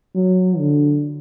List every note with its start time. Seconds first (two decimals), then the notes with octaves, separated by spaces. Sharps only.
0.15 F#3
0.58 D3